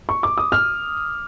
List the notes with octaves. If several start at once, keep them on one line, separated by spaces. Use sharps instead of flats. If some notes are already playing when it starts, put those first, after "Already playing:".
C#6
D6
D#6
F6